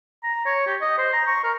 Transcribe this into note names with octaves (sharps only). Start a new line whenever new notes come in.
A#5
C#5
G4
D#5
C5
A#5
C#6
A#4